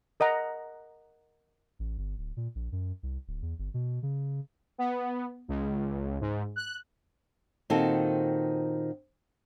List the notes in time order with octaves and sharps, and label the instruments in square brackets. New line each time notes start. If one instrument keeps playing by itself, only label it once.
[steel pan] A#4 D#5 F#5 A#5
[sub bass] A1
G1
D1
A#2
A#1
F#2
C2
D1
E2
G1
B2
C#3
[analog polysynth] B3
C#2
G#2
F#6
[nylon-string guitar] A#2 D#3 C4 F#4 A4